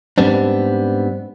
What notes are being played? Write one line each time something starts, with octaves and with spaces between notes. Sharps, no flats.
G#2 G3 B3 C4 D4